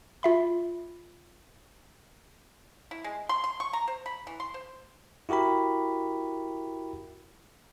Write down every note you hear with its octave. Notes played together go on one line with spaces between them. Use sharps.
F4 E5 B5
E4
G#3
C6
C6
C#6
A#5
C5
B5
E3
C6
C5
E4 F#4 G4 A#4 B5